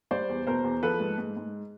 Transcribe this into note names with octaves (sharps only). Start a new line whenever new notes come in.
G3 C5 D5
E2
B2 A#4 C5
E2
F3 A4 B4
G#2
G#2
G#2